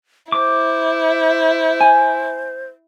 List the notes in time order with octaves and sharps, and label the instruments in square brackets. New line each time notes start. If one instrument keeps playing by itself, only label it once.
[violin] E4 [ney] C5 [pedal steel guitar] D6
[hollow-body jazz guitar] G#5